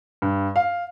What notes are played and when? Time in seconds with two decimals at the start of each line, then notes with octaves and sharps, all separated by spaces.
0.22 G2
0.56 F5